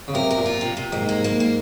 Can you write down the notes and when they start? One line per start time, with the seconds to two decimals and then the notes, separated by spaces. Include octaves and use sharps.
0.08 C#3
0.14 C3 A#4
0.30 A#4
0.38 A#2
0.46 F4
0.61 C3
0.77 C3
0.92 G#2 A#3
1.09 A#3
1.24 A#3
1.40 A#3